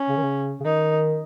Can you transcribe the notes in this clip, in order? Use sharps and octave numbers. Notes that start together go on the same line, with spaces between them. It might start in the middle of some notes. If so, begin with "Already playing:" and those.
Already playing: C#4
C#3
D#3
C#3
C#3
D#3 D#4